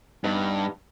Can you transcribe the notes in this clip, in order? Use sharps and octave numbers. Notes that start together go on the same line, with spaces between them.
G2 G3 B3 D#4